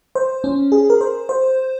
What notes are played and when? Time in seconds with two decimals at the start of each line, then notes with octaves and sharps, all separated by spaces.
0.15 C5
0.44 C#4
0.72 G#4
0.90 A#4
1.01 C5
1.29 C5